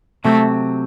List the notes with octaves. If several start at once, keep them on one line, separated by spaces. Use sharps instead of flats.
C3 F#3 A3 C4